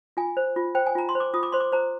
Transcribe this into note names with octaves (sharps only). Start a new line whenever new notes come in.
F4 G#5
C5
F4
C5 G5
G#5
F4 A#5
C6
C5
D6
F4 D#6
D6
C5 C6
D6
C5 A#5